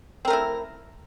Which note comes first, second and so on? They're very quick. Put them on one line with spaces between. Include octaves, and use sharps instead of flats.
C4 A#4 A3 E4